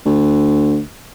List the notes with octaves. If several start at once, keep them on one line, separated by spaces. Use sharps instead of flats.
D2